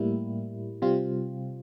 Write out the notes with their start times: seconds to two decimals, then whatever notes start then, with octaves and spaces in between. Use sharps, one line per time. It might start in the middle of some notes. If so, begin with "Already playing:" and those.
Already playing: A2 G3 A#3 E4
0.82 C3 G3 C4 F4